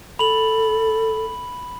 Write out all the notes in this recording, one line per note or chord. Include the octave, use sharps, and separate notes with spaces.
A4 B5 F#7